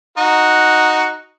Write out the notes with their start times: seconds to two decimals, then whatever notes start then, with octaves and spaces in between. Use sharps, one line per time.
0.18 D#4 F#4